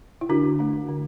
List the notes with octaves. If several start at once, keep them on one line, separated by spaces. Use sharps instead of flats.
E4
D3 D4 F#4
A3 D4
D3